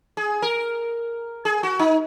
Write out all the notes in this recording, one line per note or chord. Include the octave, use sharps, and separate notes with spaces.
G#4
A#4
G#4
F#4
D#4